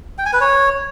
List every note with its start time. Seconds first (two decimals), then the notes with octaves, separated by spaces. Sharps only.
0.18 G5
0.26 G#5
0.33 B4
0.41 C#5